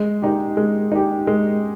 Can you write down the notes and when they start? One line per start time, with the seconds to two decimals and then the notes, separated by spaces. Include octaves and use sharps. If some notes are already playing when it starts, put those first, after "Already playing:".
Already playing: G#3
0.22 D#4 G4
0.57 G#3
0.92 D#4 G4
1.27 G#3